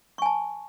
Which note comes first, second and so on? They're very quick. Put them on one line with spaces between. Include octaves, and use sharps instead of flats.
C#6 G#5 A5